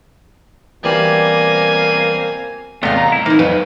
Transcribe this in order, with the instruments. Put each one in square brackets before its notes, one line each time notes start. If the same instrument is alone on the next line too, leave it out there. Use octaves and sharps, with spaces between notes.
[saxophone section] B2 A#3 C4 [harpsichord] E3 G3 [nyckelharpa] G#5
[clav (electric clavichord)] E2 C3 B3 [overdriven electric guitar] A3 [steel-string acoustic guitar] D#5 F5
[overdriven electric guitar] C2 A#5
[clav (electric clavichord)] E4
[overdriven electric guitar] E3 [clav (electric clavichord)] A#3 [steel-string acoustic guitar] D#4 E4
[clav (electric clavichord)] F2 [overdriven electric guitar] F#3 F4 [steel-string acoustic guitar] B4